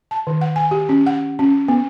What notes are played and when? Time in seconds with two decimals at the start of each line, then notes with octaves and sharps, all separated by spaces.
0.11 A5
0.27 D#3
0.41 F#5
0.56 G#5
0.71 G4
0.89 C#4
1.06 F#5
1.39 C#4
1.68 B3